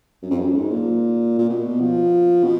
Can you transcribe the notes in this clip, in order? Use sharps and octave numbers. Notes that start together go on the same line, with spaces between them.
F#2
F2
F#2
G#2
A#2
A#2
B2
F3
B2